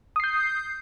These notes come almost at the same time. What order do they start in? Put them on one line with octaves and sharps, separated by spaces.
D#6 C7 G6